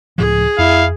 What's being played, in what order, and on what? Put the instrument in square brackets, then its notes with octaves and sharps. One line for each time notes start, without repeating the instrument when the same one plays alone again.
[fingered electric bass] C#2 A2 F3 [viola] G#4
[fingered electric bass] F2 [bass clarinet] E4 [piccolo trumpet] F5